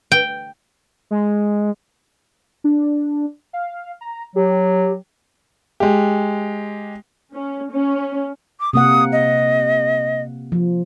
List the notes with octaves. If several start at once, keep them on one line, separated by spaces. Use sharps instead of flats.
G5
G#3
D4
F5
A#5
F#3 G4
G#3 G4
C#4
C#4
D6
C3 A#3 F#5 D#6
D#5
F3